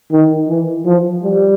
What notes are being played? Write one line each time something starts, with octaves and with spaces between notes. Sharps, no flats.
D#3
E3
F3
G3